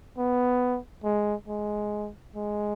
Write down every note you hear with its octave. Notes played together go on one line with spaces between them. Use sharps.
B3
G#3
G#3
G#3